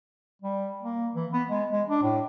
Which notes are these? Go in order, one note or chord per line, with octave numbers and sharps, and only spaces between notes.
G3
A#3
E3
B3
G#3
G#3
D4
A2